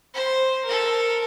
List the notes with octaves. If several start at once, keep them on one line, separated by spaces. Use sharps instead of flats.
C5
A4 A#4